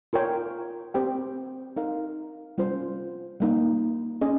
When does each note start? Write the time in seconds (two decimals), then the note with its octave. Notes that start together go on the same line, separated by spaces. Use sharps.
0.13 F4 A#4 C#5 G5
0.94 C4 G4 C5 G5
1.77 D#4 A#4 F5
2.58 G3 C#4 F4 C5
3.40 G3 A#3 D#4
4.21 C#4 G#4 D#5